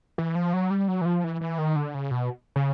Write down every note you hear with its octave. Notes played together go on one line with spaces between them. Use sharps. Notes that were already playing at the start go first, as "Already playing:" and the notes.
E3
F3
F#3
G3
F#3
E3
F3
E3
E3
D#3
D3
C#3
B2
C#3